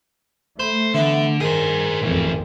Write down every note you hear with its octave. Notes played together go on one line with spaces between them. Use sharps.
A3 C5 B5
D3 E3 B3
G2 D#3 G#4 C5
G#1 F2 A2 E3